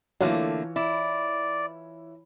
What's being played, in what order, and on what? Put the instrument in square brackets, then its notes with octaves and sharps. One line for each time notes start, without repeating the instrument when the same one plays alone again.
[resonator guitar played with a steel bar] D3 A3 A#3 [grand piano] E3 F4 C#5 [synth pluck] F#3 F5
[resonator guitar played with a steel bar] E4 [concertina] D5